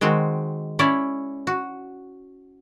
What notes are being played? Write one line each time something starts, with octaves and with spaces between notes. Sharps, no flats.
D#3 G#3 C4 F#4
C#4 E4 C#5 D5
F#4